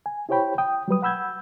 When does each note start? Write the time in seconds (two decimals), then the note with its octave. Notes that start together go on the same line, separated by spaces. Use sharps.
0.06 G#5
0.29 E4 G4 C5 C#5 G5 B5
0.58 G5 D#6
0.88 F#3 G3 B4 D#6
1.02 F#5 B5 E6 G6 G#6